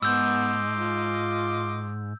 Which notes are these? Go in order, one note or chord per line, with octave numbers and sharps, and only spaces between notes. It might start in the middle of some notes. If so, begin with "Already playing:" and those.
G#2 B3 D#5 C6 D6 E6 G6
F4